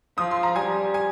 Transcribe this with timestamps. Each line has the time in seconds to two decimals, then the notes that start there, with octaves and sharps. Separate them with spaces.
0.17 F3 D#6
0.31 C6
0.43 A#5
0.56 G3 G#5
0.94 G#5